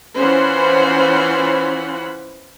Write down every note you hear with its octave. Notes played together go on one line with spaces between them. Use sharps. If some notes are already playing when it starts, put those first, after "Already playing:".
E3 C#4 F4 C5 F#5 B5